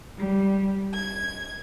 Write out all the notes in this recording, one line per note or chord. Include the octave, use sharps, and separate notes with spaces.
G3
G#6